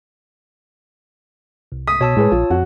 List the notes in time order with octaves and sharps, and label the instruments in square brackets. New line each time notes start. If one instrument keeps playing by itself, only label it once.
[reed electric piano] C2
[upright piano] D#6 [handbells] B6
[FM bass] B2 [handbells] C#5 A5 E6
[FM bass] A2 [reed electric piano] G#3 G#4 B4
[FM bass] A#1 [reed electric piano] F4
[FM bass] F2 [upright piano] F#4